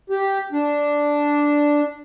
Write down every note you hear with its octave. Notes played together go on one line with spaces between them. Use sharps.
G4
D4